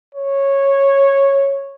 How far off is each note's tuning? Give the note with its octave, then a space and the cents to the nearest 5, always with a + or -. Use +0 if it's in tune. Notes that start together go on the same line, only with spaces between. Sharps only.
C#5 -10